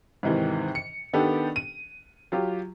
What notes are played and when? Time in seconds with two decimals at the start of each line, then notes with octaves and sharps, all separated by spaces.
0.23 G#2 C3 D#3 E3
0.75 C#7
1.13 D#3 B3 D4 G4 A4
1.56 D#7
2.32 F#3 F4 G4